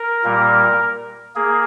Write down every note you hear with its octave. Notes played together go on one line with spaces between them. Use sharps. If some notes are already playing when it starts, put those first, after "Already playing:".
Already playing: A#4
A#2 G3 A#3
A#3 G#4